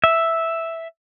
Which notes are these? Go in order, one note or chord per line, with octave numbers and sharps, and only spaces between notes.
E5